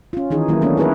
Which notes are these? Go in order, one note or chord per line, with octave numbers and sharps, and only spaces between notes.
C#4 F4
D#3 E3 D#4 G#4
D#3 F#3 A#3 E4
A3 B3 C#4 D4 A4
E4 G#4 A#4 B4